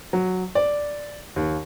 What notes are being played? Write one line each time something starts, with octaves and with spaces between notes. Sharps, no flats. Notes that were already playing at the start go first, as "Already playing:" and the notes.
F#3
D5
D#2